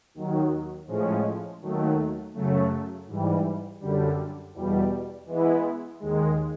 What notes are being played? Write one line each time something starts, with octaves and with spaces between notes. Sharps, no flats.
D#2 D#3 F#3
A2 F3 G#3 C#4
D#2 D#3 F#3 A3
F#2 C#3 F#3 A3
G#2 E3 G3
F#2 D3 G3
E2 B2 G3
E3 G#3 B3 E4
D#2 D#3 G#3